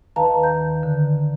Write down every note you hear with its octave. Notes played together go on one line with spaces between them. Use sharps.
D#2 D#3 B4 F5 A5 A#5
G6
D3